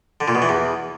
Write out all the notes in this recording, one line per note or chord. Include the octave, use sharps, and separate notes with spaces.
D3
A#2
B2
E3
E2